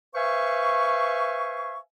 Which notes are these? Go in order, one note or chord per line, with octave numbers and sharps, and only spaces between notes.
B4 C5 E5 F5 G#5 C#6